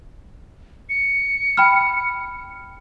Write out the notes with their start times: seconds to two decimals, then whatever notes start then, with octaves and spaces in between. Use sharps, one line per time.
0.89 C#7
1.57 G5 B5 F6